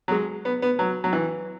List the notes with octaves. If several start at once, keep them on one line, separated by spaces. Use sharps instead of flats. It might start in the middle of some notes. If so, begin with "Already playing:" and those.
F#3
G#3
B3
B3
F#3
F#3
E3